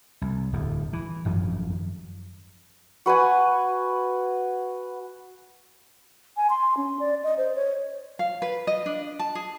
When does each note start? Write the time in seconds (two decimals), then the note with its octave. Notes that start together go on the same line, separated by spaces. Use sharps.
0.22 C2
0.53 D1 E2
0.93 E3
1.25 G#1 F#2 F3 F#3
3.06 F#4 B4 F#5 G#5
6.37 G#5
6.50 C6
6.77 C#4
7.00 D5
7.24 D#5
7.38 C5
7.56 C#5
8.19 F5
8.42 B4
8.67 D#5
8.86 D4
9.19 A5
9.35 G#4